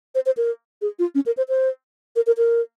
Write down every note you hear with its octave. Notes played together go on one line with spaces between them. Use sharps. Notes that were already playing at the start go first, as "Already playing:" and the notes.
C5
C5
A#4
G#4
F4
C#4
A#4
C5
C5
A#4
A#4
A#4